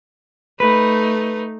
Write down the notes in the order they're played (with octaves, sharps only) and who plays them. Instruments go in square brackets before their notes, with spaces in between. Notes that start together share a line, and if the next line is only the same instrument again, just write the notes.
[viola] A3 D#4 [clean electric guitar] B4